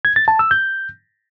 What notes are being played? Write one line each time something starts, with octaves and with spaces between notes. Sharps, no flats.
G#6
A6
A5
E6
G6